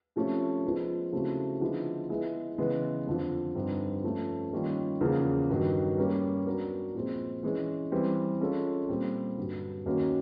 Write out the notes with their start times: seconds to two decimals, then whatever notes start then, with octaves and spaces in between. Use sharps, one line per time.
0.16 C3 F3 A3 C#4
0.64 F3 G#3 B3
1.12 C#3 F#3 A3 C4 E4
1.61 D3 F3 G#3 B3 E4
2.10 G#3 B3 E4 G#4
2.58 C#3 E3 G#3 B3
3.07 F2 D3 F3
3.55 G2 D3 G3 C4 D#4
4.04 F3 A3 C#4
4.53 D#3 G3 A#3 C#4 F4
5.01 E2 C#3 F3 A#3
5.49 G2 D#3 F#3
5.98 G3 A#3 C#4
6.46 F#3 B3 D4 F#4 A#4
6.95 A#2 F3 G#3 C4
7.43 E3 G#3 C#4
7.92 E3 G3 C4
8.40 G#3 C#4 F4 A4
8.89 A#2 G3 C4
9.38 G2 D3 F#3
9.86 F#2 D#3 F#3 A#3 C#4